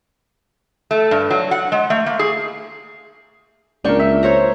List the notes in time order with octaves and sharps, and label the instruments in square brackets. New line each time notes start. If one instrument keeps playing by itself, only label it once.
[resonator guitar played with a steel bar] A3
G2
F#3
F#5
G#3
A3
A#3
G#4
[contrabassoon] C#2 [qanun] A#3 G5 C#6 [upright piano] D4 A#4
[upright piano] E5
[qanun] C5 C#5 A#5